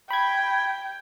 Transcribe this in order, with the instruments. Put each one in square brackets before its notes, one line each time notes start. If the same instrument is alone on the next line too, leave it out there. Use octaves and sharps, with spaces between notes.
[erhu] G5 [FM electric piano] B5 G#6